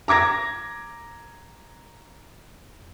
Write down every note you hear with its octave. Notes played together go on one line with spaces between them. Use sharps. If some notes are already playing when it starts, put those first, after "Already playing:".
A#5 D6 G#6 A#6